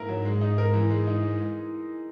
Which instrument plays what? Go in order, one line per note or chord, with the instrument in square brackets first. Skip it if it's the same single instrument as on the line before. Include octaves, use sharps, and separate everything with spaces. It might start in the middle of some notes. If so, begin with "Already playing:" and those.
Already playing: [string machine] G#2 [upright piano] A#3 E4 A#4
[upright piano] F#3
G#3
D#4
A#4
E3
G#3
D#4